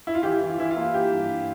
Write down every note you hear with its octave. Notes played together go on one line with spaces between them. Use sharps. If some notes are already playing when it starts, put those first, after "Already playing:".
E4
F4
E3 G4
E3
F4
E3 E4
F4
A#3
E3 G4
G2
G2